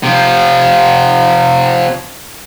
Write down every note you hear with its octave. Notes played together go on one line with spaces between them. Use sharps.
C3 F3